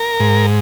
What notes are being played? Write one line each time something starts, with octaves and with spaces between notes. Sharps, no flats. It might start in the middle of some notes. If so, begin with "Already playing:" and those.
Already playing: A#4
G#2